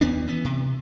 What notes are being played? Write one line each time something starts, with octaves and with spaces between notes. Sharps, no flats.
D#2 B3 C#4 D4
E3 B3
C3